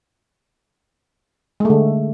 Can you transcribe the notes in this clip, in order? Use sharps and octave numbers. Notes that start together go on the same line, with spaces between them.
D3 G#3 A3